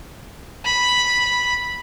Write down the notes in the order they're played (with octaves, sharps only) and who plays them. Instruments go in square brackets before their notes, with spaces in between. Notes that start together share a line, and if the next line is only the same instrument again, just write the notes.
[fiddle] B5